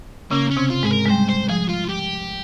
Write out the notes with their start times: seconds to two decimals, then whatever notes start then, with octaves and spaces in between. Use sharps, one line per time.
0.31 C#3 A#3 C#4
0.51 C#4
0.57 C3 C4
0.70 F4
0.83 G#2 G#3 G#4
0.90 A#4
1.06 G#3
1.10 G3 C5
1.29 C5
1.49 F3 G#4
1.69 F4
1.89 G4